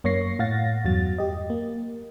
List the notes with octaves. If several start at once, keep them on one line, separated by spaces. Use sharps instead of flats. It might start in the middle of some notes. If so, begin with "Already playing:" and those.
F#2 A#3 C#5 C#6 A#6 C7
A2 F5 F#5 A6 A#6
E2 G2 F#3 A6
G4 D#5
A#3